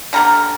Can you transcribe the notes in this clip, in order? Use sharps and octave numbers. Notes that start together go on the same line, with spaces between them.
D3 G3 A#3 A#4